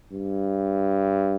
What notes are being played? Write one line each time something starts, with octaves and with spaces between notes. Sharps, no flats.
G2